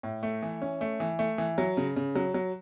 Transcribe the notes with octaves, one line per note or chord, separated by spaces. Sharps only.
A2
A3
E3
C#4
A3
E3
A3
E3
F#3
C#3
C#3
F#3
F#3